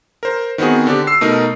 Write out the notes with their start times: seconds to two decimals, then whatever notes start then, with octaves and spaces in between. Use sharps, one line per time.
0.23 A#4 C5
0.58 D#3 B3 C4 F#4 G#4
0.87 D3 D4 G4
1.07 E6 C7
1.21 B2 A3 D#4 A#4